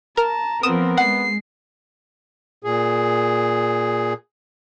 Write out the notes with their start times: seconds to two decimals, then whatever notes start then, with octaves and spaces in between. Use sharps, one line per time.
0.17 A#4 A5 A#5
0.63 F3 B3 C4 A#4 D#6 E7
0.97 G#3 F#5 C7
2.64 A#2 G#4